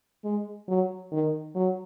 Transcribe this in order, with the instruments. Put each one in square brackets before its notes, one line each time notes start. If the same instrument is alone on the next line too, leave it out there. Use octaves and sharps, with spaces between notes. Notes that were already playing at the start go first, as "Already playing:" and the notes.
[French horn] G#3
F#3
D#3
F#3